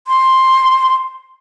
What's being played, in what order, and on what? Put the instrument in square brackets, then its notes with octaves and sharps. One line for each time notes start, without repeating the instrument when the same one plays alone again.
[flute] C6